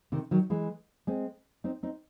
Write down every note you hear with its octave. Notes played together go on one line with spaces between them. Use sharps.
C3 D#3
D#3 F#3
E3 G#3
G#3 C4
C4 D#4
C4 D#4